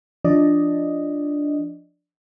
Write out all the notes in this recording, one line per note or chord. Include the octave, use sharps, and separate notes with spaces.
F3 D4 D5 D#5